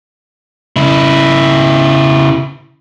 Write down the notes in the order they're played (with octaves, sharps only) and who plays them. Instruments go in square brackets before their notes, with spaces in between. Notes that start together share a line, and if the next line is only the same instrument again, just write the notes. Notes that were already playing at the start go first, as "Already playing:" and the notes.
[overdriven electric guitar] C#3 E4